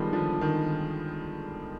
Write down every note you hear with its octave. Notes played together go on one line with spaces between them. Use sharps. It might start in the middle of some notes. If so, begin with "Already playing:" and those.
Already playing: D#3 F3 G3 G#3 B3
D3 F3
D#3